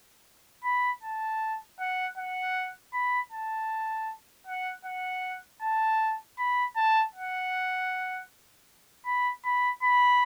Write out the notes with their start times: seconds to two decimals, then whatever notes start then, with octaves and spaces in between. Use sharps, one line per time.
0.64 B5
1.03 A5
1.80 F#5
2.17 F#5
2.93 B5
3.32 A5
4.47 F#5
4.85 F#5
5.62 A5
6.38 B5
6.76 A5
7.15 F#5
9.06 B5
9.45 B5
9.83 B5